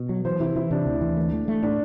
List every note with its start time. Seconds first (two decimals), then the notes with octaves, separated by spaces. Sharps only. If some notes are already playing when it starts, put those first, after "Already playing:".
Already playing: B2
0.09 F#3
0.25 E3 C5
0.40 C3 E4
0.56 E3 E4
0.71 C3 D4
0.86 D2
1.01 E3
1.17 A3
1.33 A3
1.48 A3
1.63 A2 D4